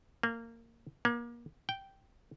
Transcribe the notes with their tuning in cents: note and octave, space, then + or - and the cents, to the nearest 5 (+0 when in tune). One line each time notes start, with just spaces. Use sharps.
A#3 -20
A#3 +30
G5 -5